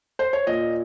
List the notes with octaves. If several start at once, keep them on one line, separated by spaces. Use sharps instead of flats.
C5
C#5
A#2 D#5